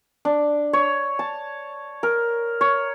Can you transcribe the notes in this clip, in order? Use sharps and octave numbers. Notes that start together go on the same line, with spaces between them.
D4
C#5
A5
A#4
C#5